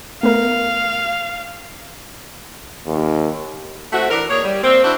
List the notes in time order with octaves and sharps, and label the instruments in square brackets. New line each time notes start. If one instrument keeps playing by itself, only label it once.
[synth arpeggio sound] A3 B3 A#4 [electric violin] F5
[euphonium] D#2
[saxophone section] A3 C4 E4 F#4
E3 D4 A#4
A#3 G#4 A#4 C#5
G3
A#3 C4
D4 E4 F#4 C5